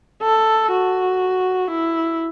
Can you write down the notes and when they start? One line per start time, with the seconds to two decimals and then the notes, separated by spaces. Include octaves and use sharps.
0.22 A4
0.72 F#4
1.71 E4